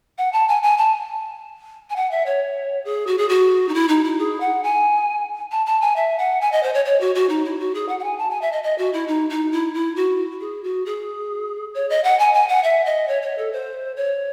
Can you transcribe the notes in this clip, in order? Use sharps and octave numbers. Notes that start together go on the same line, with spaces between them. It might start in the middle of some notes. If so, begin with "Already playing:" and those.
F#5
A5
G#5
G#5
A5
G#5
F#5
E5
C#5
G#4
F#4
G#4
F#4
D#4
E4
D#4
E4
G#4
F#5
G#5
A5
A5
G#5
E5
F#5
G#5
D#5
C5
C#5
C#5
F#4
F#4
D#4
E4
F#4
G#4
F#5
F#5
G#5
A5
G#5
E5
D#5
D#5
F#4
E4
D#4
D#4
E4
E4
F#4
G#4
F#4
G#4
C#5
D#5
F#5
G#5
G#5
F#5
E5
D#5
C#5
C#5
A4
C5
C#5